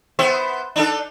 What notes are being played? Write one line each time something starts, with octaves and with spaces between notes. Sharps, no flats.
B3 C5 E5
D4 D#4 A4